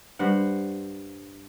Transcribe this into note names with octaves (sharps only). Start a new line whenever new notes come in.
G2 C5 F#5